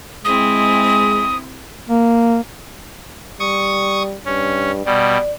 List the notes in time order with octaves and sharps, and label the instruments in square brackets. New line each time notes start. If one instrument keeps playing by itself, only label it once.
[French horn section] G#3 [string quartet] C4 E4 [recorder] D#6
[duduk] A#3
[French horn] G3 [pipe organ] C#6 D#6
[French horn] G2 [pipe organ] C#4
[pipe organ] B2 G3 [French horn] D5